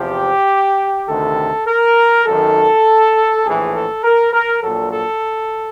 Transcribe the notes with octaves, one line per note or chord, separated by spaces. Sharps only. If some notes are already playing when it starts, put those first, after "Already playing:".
Already playing: E2 C3 F3 G4
D2 C3 D#3 A4
A#4
G#1 F#2 D#3 A4
A#1 A2 E3 G#4
A4
A#4
A#4
A#1 A#2 F#3 A4
A4